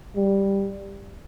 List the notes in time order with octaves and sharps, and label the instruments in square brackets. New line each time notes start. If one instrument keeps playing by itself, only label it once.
[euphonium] G3